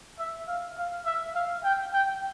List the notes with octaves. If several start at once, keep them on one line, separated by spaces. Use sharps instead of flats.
E5
F5
F5
E5
F5
G5
G5